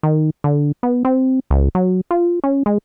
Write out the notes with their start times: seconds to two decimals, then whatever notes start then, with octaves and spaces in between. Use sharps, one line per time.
0.03 D#3
0.44 D3
0.83 B3
1.05 C4
1.50 C#2
1.75 F#3
2.11 F4
2.44 C#4
2.66 G#3